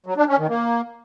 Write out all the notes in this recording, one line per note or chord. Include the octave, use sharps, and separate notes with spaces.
F#3
D4
C#4
D#3
A#3